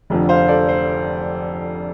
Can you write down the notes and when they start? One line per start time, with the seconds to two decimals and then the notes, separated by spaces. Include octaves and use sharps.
0.10 F1 F2 D3
0.29 C5 F5
0.48 A4 D5
0.69 C5